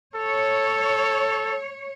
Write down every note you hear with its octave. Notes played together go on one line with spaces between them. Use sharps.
A4 C#5